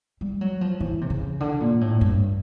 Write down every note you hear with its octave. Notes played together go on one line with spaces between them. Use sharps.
G3
F#3
F3
E3
C3
C#3
D3
A#2
A2
G2